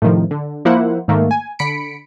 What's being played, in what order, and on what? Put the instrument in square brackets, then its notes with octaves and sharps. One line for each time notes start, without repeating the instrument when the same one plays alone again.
[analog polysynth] A2 C3 D#3 F3
D3
F3 A#3 E4 C5 F#5
G#2 D#3 A3 A#3
G#5
D3 B5 B6 C#7 D7